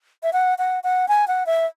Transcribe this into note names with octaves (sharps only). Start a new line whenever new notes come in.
E5
F#5
F#5
F#5
G#5
F#5
E5